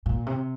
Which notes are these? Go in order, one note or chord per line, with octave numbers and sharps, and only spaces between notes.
A#2
C3